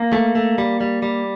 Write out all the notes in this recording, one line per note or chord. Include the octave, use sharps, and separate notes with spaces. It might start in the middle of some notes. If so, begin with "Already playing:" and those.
Already playing: A#3
A3
A3
G3
G3
G3